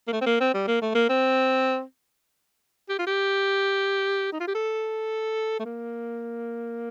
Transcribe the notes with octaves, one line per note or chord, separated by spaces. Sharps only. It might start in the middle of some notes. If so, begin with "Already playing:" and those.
A#3
A3
C4
A#3
C4
G3
A#3
A3
A#3
C4
G4
F4
G4
D#4
F4
G4
A4
A3
A#3